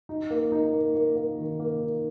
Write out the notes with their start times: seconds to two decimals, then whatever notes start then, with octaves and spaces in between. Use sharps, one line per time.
0.09 D#4
0.30 A#3
0.52 D#4
0.74 A#3
0.95 A#3
1.17 A#3
1.38 D#3
1.59 A#3
1.81 D#4